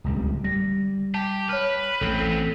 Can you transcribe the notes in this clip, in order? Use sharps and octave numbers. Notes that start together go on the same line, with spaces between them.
D1 C#2 G3
G3 A#6
G4 A5
B4 C#5 F6
A1 B3 C4 A4